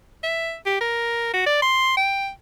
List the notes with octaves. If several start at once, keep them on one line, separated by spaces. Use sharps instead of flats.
E5
G4
A#4
F#4
D5
C6
G5